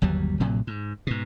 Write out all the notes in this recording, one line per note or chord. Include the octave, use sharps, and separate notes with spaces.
G1 D#2 F#3 G3
A#1 A2 C3 F#3
G#2
G#2 B2